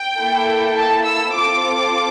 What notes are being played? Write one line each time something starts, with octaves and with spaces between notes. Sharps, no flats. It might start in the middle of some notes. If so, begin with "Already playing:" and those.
Already playing: G5
A#3 E4 A4
A5
E6
C4 F4 A4 D6